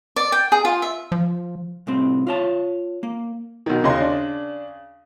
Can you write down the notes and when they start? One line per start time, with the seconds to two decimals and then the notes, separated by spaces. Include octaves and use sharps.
0.16 D5
0.32 G5
0.52 G#4
0.65 F4
0.82 E5
1.12 F3
1.87 C2 A2 C4
2.27 F4 C#5 A5
3.03 A#3
3.66 B1 D#3
3.84 D#2 C#3 D#5 C6
4.00 D4